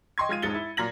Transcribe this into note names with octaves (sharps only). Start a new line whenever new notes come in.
D#5 G5 C6 C#6 G#6
G#3 F4 G#6 D#7
E1 G#2 G#3 A6 C#7 G7
E4
A#2 F#3 A#5 G#6 A#6 F#7